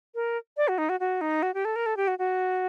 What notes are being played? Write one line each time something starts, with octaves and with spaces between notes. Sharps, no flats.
A#4
D5
F#4
D#4
F#4
F#4
D#4
F#4
G4
A4
A#4
A4
G4
F#4
F#4